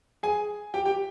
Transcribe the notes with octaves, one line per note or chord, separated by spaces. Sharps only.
G#4 G#5
G4 G5
G4 G5